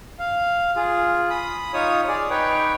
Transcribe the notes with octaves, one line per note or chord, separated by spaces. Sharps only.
F5
F4 G#4
B5 D#6
D#4 F4 C#5 D#6
G#4 D5
D#4 B4 C#5 G5